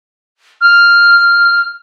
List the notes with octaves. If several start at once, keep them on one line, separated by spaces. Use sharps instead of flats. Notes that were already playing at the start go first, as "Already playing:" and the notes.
F6